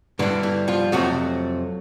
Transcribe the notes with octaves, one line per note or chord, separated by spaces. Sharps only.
G2 D3 E3 G3 D4
E3 E4
F3 F4
F2 C3 F3 F#3 A3 F#4